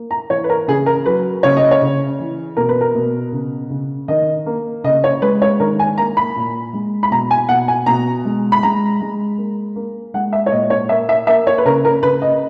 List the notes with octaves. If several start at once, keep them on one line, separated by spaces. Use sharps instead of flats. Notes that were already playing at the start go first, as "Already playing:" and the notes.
Already playing: A#3
A#5
E3 C#5
B4
A#4
C#3 G#4
A#4
F#3 B4
C#3 C#5
D#5
C#5
C#3
E3
B2 A#4
B4
A#4
B2
C#3
C#3
D#3 D#5
A#3
C#3 D#5
C#5
G#3 B4
C#5
D#3 A#4
G#5
A#3 A#5
B5
A#2
G#3
B5
B2 A#5
G#5
B2 F#5
G#5
B2 A#5
G#3
B5
G#3 A#5
G#3
A#3
A#3
G#3 F#5
E5
C#5
A#2 D#5
C#5
A#3 E5
E5
A#3 E5
C#5
B4
C#3 A#4
A#4
C#3 B4
D#5